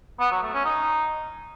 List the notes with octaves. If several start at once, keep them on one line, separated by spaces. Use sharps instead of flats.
B3
F#3
A3
C#4
D#4